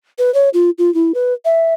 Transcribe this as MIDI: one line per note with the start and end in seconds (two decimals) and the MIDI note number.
0.18 0.33 71
0.34 0.49 73
0.54 0.70 65
0.78 0.93 65
0.94 1.12 64
1.14 1.34 71
1.45 1.74 76